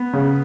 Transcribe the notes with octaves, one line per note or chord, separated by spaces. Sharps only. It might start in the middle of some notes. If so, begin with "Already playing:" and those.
Already playing: B3
C#3